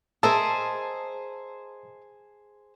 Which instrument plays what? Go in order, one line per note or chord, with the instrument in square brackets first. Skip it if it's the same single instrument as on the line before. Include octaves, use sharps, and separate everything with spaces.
[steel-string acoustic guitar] G#4 C5 [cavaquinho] A#4 D#5 E5 [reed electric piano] A5